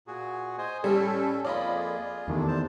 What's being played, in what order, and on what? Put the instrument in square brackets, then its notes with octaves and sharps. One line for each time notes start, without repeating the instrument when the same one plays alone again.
[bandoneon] A#2 F#4 G#4
C5 D#5 G#5
[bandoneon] A2 [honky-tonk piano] G3 [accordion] C#4 A4
[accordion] F2 A#3 [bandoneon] F4 G#4 [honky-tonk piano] D5 D#5 B5
[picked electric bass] E2 D#3 [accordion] A3 D4
[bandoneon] C5 A5